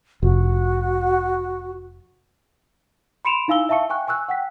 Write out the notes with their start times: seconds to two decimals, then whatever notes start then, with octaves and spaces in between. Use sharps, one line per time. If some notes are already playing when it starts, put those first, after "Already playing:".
0.23 F1 F#4
3.25 B5 C6 C#7 D7 E7 F7
3.48 D#4 E4 F5 G#5 E6 G7
3.69 E5 F5 A5 C#6 C#7
3.90 G5 G#5 C#6 F#6
4.08 G#5 C#6 E6 F#6
4.28 F#5 G5 B6